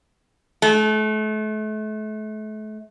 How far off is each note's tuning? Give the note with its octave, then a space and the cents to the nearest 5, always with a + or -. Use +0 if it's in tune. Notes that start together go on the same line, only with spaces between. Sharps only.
A3 -35